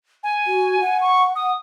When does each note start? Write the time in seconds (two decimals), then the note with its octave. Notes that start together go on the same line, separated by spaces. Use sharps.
0.23 G#5
0.47 F#4
0.81 F#5
1.01 C#6
1.36 D#6